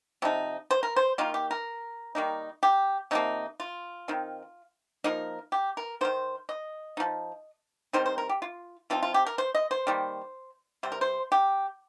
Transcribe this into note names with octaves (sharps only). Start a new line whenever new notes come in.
C3 F3 D#4
C5
A#4
C5
D#3 A#3 D#4 F4
G4
A#4
D#3 G3 A#3 D#4
G4
C3 F3 A#3 D#4
F4
D#3 C4 D#4
F3 A#3 D#4 A#4
G4
A#4
D#3 A#3 D#4 C5
D#5
F3 D#4
D#3 G3 C4 D#4 C5
C5
A#4
G4
F4
F3 C4 D#4 F4
F4
G4
A#4
C5
D#5
C5
D#3 G3 A#3
C3 G3 C4 C5
A#4
C5
G4